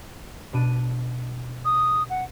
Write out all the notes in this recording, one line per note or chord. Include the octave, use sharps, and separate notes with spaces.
B2 D4 D#7
D#6
F#5